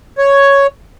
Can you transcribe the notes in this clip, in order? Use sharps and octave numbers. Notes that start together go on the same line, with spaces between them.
C#5